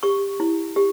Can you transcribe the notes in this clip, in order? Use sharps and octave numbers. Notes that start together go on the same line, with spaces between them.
G4 C#6
E4
G4